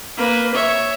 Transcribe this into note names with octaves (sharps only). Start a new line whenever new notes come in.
A#3 B4
C#5 E5